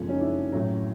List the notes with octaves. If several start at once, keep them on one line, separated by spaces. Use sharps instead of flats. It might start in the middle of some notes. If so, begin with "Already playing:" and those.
Already playing: F#1 F2 C#3 F3 G#3
C#4 D#4
D4 E4
A1 A2 F#3